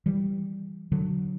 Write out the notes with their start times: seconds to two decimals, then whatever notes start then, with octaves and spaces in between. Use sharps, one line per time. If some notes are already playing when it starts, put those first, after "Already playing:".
0.06 E3 G3
0.92 D3 F#3